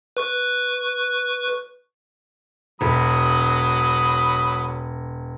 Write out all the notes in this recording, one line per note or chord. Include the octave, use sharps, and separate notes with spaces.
B4 C#6 F#6
E1 F#3 B5 D#6